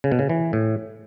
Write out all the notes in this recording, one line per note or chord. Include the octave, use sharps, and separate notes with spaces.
C#3
B2
C#3
E3
A2